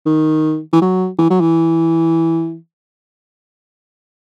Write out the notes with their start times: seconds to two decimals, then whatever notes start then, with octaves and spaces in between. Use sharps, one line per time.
0.06 D#3
0.73 E3
0.82 F#3
1.19 E3
1.30 F#3
1.40 E3